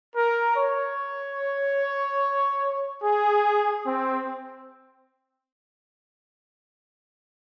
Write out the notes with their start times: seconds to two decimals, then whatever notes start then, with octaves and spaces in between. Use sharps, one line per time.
0.15 A#4
0.56 C#5
3.03 G#4
3.85 C4